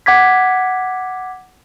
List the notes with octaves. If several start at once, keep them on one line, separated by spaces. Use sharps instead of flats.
F#5 D6 G#6 B6